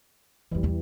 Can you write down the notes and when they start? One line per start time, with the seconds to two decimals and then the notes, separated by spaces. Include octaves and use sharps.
0.52 D#1 F2 E3 G3
0.63 E2 E4